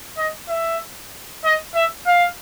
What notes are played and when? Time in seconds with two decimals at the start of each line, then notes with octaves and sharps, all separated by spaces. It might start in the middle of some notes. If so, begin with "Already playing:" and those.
0.18 D#5
0.49 E5
1.44 D#5
1.75 E5
2.07 F5